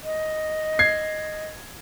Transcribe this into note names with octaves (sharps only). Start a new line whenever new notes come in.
D#5
G#6 C7